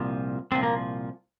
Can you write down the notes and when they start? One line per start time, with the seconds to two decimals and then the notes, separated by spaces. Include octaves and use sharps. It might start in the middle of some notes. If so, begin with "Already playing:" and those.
Already playing: C2 A#2 F3
0.52 C2 A#2 F3 C4
0.63 A#3